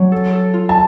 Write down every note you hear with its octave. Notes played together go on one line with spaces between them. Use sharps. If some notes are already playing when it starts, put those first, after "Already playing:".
Already playing: F#3 C#4
A4
A4
F4
A5